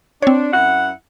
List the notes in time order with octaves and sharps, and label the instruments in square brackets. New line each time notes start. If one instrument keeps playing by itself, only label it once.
[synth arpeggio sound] C4 C#5 [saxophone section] D4
[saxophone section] F#2 E4 F#5